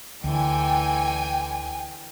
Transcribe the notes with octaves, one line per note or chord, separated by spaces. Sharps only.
D2 D3 E3 G5 G#5